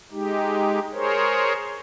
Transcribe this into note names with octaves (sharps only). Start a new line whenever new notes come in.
G#3 D#4 G4
G#4 A#4 C5 C#5